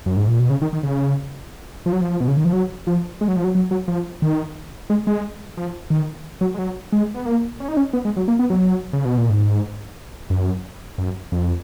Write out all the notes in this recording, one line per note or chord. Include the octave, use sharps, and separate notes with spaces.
F#2
G#2
A#2
B2
C#3
D#3
D#3
C#3
F3
F#3
F3
B2
C#3
D#3
F3
F#3
F3
G#3
F#3
F3
F#3
F#3
F#3
F3
D#3
G#3
G#3
F3
D#3
F#3
G#3
F#3
G#3
B3
A#3
C#4
D#4
C#4
B3
G#3
F#3
A#3
B3
F#3
C#3
B2
A#2
G#2
F#2
F#2
F2